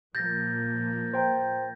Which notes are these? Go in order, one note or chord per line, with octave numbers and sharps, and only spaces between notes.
A#2 F3 A#3 G6 A6 A#6
C5 G5 A#5